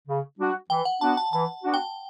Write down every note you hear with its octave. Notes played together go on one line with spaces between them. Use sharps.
C#3
G3 D4 F#4
E3 G5
F#5
B3 D4 F#4 A5
A5
E3 A5
B3 D4 F#4
G5